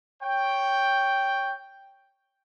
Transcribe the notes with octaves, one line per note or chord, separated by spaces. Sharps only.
C#5 G5